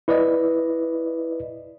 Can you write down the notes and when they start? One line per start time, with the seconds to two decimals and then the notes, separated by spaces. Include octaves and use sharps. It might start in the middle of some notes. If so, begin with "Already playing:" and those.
0.08 E4 B4 D5 D#5